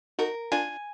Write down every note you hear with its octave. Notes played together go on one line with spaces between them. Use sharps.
D#4 F#4 A#4
D4 F4 G#5